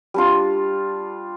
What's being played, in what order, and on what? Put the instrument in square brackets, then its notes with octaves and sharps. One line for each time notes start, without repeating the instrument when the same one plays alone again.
[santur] G3 D4 F4